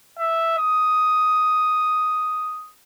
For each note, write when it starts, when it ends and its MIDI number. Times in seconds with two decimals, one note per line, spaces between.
0.19 0.54 76
0.58 2.70 87